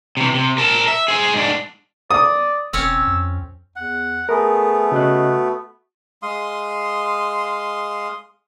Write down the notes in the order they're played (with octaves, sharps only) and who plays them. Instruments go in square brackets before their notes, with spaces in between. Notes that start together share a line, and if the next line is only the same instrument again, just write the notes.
[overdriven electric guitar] C3 E3
C3
A#4 A5
E5
G#4 C5
G#2 D4
[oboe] D5 [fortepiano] D#6
[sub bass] E1 [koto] C4 C#4 C#5 [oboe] E6
[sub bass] F2
[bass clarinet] E2 [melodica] F#5
[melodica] A3 B3 [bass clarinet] G#4 [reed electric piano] A#4
[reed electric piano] C#3 D#5 F#6 [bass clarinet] F#4
[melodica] G#3 F5 C6 D#6